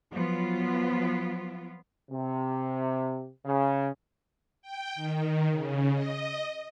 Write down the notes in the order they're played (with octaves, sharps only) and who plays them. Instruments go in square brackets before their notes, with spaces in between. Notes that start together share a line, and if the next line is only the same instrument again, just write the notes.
[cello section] F3 F#3 B3 F4
[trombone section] C3
C#3
[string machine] G5
D#3
C#3
D#5